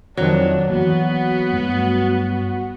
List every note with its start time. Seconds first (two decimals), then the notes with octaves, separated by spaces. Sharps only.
0.17 F2 D#3 F3 F#3 D4
0.70 E3 A#3 B3 F#4
1.53 G2 A3